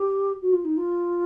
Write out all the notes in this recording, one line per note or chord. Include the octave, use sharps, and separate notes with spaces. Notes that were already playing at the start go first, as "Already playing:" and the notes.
Already playing: G4
F#4
F4
D#4
F4